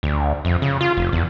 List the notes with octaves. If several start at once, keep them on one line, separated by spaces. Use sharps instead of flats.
D2
F2
C#3
F4
F1
E2